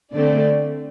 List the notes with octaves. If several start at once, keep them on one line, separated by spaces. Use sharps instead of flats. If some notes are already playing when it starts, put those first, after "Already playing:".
D3 A3 C4 D5